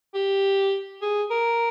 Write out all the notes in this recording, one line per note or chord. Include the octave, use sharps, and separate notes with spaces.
G4
G#4
A#4